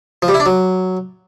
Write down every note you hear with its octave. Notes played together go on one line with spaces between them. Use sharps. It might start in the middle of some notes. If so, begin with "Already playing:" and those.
F3
G3
E4
D4
F#3